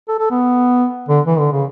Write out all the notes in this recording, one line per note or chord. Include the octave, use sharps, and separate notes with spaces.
A4
A4
B3
D3
E3
D3
C#3